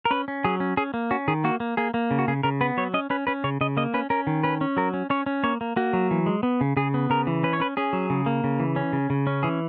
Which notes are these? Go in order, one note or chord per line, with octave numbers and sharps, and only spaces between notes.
A#4
C#4 B4
C#4
F#3 G#4
C#4
C#4 G#4
A#3
C#4 F#4
D#3 G#4
A#3 F#4
A#3
A#3 G#4
A#3
C#3
F#4
C#3 G#4
C#3 A#4
B3 B4
F#3 C#5
C#4 D#5
C#4 B4
C#4 B4
C#3 C#5
C#3 D#5
A#3 D#5
C#4 B4
C#4 A#4
D#3
C#4 B4
C#4
F#3 A#4
C#4
C#4 C#5
C#4
A#3 C#5
A#3
A#3 F#4
F#3
E3
G#3
B3
C#3
C#3 G#4
B3
C#3 A#4
E3
C#4 B4
C#5
C#4 B4
C#4 G#4
F#3
C#3
A#3
C#3
E3
C#4
C#3
C#3
C#4
E3 G#4